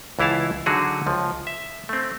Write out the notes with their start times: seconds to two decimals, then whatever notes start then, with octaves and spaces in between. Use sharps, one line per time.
0.19 C#2 E3 E4 F5 A5
0.66 D3 F#3 D#4 F#4 G#4
1.07 C#2 F3
1.47 E5
1.89 A3 C4